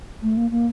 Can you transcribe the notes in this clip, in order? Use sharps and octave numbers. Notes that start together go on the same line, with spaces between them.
A3
A#3
A#3